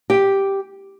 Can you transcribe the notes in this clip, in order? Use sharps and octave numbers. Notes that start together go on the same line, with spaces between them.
G4